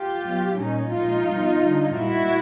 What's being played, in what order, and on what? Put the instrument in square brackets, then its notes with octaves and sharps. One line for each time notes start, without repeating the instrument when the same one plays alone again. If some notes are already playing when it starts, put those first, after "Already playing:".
Already playing: [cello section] F4 G4
B2 F#3
A#2 G3 C#4 D#4
A#2 F3 G#3 D#4 F4
B2 G3
G3
D3
A#2 G3 E4 F#4